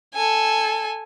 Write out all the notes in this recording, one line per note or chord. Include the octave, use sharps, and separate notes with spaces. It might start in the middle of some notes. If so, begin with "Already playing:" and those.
A4 G#5